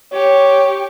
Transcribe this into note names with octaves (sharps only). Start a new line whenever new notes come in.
G4 C#5